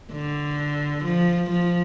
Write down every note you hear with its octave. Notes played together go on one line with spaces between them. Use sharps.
D3
F3
F3